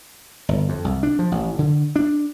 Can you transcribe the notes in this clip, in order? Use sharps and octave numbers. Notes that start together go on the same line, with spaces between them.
G1
F2
C2
D4
F3
A1
D3
D4